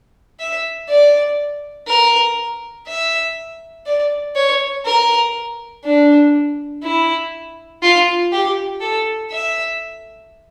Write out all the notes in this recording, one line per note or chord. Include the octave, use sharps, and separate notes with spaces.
E5
D5
A#4
E5
D5
C#5
A#4
D4
E4
F4
G4
A4
E5